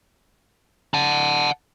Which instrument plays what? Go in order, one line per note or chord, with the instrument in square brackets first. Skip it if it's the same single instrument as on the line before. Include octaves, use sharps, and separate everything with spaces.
[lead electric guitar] F#5 A5